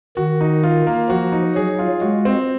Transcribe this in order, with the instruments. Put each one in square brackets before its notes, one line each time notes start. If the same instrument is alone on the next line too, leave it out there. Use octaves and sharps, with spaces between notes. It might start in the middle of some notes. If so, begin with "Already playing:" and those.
[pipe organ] D#3 [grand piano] F#4
[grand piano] D#4
F4
A#3
[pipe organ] F3 [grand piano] F#4
[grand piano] D#4
[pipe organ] F#3 [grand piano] G#4
[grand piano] F4
[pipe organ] G#3 [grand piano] F#4
[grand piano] C4